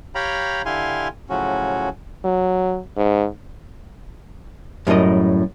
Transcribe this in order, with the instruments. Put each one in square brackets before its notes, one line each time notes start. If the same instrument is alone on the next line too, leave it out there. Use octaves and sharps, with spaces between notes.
[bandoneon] G4 C#5 F5 G5 A#5 B5
D3 E4 G4 F5 G#5 C6
A2 C#3 F3 F#3 C#4 F#4
[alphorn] F#3
G#2
[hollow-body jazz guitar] F#2 A2 G3 A#4 D#5